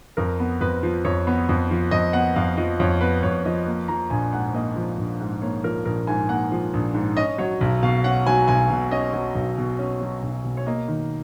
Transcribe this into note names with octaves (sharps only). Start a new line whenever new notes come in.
F2 A#4
B3
F2 B4
F3
F2 C#5
B3
F2
F3
F2 D#5
B3 F#5
F2 F5
F3 D#5
F2 C#5
B3 B4
F2 C#5
F3 D#5
A#3
F3 A#5
A#1 G#5
G#2 F#5
A#3 D#5
F3
A#1
G#2
A#3 C#5
F3 A#4
A#1 A#4
G#2 G#5
A#3 F#5
F3
A#1
G#2
C#4 D#5
F#3 C#5
B1
B2 F5
C#4 F#5
F#3 G#5
B1 G#5
B2
C#4 D#5
F#3
B1
B2
C#4
F#3
B1
B2
C#5
A#3 D#5
D#3